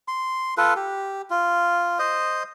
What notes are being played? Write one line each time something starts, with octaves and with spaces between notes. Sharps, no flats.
C6
F4 A4 B4
G4
F4
C5 D#5